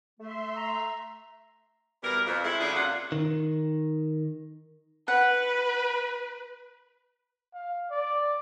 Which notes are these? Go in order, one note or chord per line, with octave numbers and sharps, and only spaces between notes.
A3 E5 C6
A#5
B2 E3 G3 A#4
F2
G#3 A3 C4 E4
C#3 F#3 A3 D4 G#4 A4
C3 A#3 D4 F4 F#5
D#3
B4 F#5
F5
D5